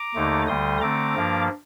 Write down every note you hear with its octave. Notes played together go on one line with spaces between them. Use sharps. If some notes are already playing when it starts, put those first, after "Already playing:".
Already playing: A#5 D6
D#2 D3 A3 D#4
D2 D3 G3 C6 D#6
D3 A3 C4 A#5 D6
G2 F3 A#3 D4